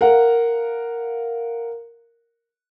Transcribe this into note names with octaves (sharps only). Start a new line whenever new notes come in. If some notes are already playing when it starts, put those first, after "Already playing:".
A#4 F5 F#5